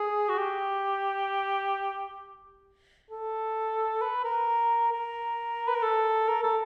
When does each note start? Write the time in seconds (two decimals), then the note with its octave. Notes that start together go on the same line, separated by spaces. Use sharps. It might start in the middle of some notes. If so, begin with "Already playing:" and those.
Already playing: G#4
0.29 F#4
0.38 G4
3.11 A4
4.01 B4
4.24 A#4
4.92 A#4
5.68 B4
5.76 A#4
5.83 A4
6.28 A#4
6.43 A4